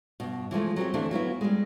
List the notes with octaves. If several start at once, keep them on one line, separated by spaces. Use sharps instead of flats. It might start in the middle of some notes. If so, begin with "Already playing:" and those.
G2 B2
E3 F3 G#3 A3
F#3 C4 G4
D2 E3 A3 A#3 C4 D4
F#3 A#3 B3 E4
G3 G#3